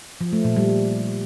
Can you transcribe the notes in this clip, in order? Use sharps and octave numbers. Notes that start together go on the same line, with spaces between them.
F3
A3
A#2
G3